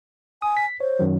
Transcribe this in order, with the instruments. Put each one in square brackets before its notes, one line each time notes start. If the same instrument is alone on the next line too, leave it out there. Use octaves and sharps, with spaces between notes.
[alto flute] G#5 [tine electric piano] D#6
[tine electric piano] B6
[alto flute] C5 [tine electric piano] C#5
[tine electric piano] F#2 D#3 F#3